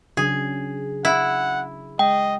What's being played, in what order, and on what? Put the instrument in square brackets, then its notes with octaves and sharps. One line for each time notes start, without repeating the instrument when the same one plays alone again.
[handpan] C#3 F#3 D4 [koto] G#4
[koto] E4 [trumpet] F#5
[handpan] G#3 [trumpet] D#5 [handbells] G5